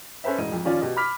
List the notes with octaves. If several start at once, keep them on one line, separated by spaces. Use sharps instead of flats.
C#4 A4 B4 C5 E5
E1 A2 D#5 D#7
F2
D#2 D#3 F3 C#4 F4 D5
B2 G4 D#5
B5 D6 F6 B6